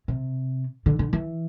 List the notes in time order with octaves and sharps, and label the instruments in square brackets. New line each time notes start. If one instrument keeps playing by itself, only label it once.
[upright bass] C3
D3
D3
E3